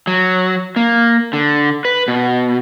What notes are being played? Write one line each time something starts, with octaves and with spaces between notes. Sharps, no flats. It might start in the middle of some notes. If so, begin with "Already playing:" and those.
F#3
A#3
D3
B4
B2